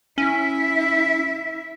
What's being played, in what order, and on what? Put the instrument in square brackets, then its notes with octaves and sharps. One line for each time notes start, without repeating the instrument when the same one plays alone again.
[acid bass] C#4 [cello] E4 E5